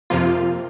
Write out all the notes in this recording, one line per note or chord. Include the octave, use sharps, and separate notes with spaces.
F2 C3 F3 A#3 F4